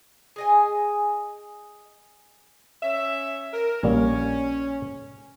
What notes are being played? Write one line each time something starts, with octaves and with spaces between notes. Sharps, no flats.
G#4 D#5 G#5
C#4 E5
A#4
A#1 G3 A#3 C#4